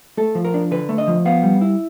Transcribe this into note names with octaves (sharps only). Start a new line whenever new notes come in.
A3 A4
F3
A#4
D4
D3 B4
A3
D#5
F3
B3 F5
G3
E4